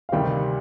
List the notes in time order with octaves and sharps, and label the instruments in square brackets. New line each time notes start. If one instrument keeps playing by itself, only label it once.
[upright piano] F5
[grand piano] D2 C3 D#3 G3 C4 [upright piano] G4 G5